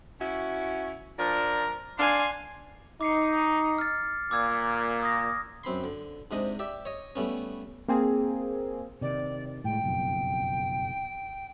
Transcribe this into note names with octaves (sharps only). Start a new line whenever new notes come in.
C#4 E4 F#4
F3 D4 F4 A#4
D4 F5 G#5 C6
D#4 D6 C7 C#7
F6 A6
A#2 D6 E6 G#6
D#6 A#6
F#2 C4 B5 C6
D3
G#2 C3 D4 D#5
G4 D5 E5
C#5 D#5
G3 A3 B3 C#4
A#3 C4 G#4
C3 D#3 D5
A2 G#3 G5
F#1 B1 F2